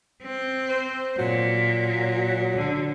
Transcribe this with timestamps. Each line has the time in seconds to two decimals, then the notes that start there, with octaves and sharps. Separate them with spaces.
0.23 C4
0.70 C5
1.18 A#2 F#3
2.56 D3